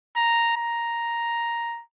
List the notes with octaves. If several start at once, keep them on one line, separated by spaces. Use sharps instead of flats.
A#5
A#5